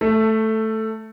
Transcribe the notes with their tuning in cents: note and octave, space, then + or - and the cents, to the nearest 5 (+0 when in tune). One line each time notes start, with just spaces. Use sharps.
A3 +0 A4 +15